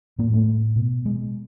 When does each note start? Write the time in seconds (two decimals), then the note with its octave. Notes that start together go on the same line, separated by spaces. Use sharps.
0.19 A2 A#3
0.34 A3
0.76 B2
1.06 G#3